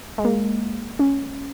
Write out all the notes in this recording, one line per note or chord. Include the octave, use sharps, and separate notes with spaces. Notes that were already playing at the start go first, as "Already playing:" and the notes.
G#3
A#3
C#4